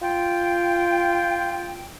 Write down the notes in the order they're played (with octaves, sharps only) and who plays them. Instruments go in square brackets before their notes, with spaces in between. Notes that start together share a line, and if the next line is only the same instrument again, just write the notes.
[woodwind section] F4 G5